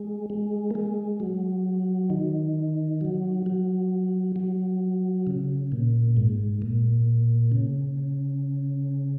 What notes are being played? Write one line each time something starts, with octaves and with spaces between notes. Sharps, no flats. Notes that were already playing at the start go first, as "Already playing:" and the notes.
Already playing: G#3
G#3
A#3
G#3
F#3
D#3
F#3
F#3
F#3
C#3
A#2
G#2
A#2
C#3